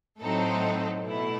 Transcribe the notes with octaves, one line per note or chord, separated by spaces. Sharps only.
A2 F#3 C4 D#4 A4
B2 A3 E4